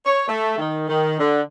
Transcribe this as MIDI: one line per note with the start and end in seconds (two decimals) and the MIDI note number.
0.06 0.26 73
0.28 0.54 57
0.58 0.87 51
0.88 1.15 51
1.20 1.41 50